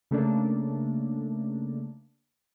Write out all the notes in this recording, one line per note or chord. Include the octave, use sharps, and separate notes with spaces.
C#3 A3 A#3 D4